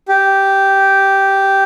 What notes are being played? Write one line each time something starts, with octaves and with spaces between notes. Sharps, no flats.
G4